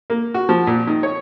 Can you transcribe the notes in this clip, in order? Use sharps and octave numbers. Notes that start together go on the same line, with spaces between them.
A#3
F#4
F3
A#2
D#3
C#5